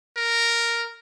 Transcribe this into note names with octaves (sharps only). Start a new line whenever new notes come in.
A#4